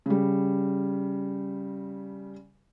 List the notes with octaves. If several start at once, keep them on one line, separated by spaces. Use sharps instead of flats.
C#3 G3